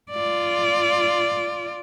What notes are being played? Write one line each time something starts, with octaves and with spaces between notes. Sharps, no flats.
F4 D5